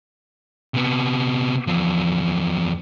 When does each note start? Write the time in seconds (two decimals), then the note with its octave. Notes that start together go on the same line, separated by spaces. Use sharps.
0.74 C3 B3
1.67 E2 F3